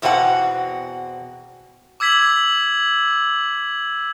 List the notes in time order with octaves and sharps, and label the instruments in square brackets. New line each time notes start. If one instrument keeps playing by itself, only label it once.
[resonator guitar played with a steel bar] E2 B2 C4 D4 F#5
[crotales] D6 E6 G#6 B6 F#7